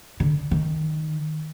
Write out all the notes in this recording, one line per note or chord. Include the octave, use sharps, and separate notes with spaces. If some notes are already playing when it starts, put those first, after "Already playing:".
D3
D#3